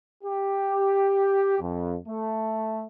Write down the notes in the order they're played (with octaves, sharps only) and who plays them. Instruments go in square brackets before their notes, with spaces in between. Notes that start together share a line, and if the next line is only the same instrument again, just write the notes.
[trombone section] G4
F2
A3